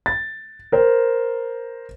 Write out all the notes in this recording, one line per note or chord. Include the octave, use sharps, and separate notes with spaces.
A6
A#4 C5